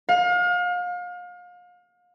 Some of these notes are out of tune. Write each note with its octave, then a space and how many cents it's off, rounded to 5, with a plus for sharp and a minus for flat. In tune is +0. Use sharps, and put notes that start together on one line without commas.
F5 +35